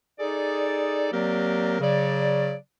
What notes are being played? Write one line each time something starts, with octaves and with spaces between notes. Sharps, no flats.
D#4 G#4 A4 D5
F#3 A#3 C4 G4 A#4 D5
C#3 F#3 D5